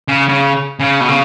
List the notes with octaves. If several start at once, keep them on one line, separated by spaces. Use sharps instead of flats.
C#3
C#3
C#3
B2
C#3